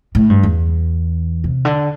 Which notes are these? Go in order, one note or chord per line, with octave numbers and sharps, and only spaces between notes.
A2
G2
E2
C3
D3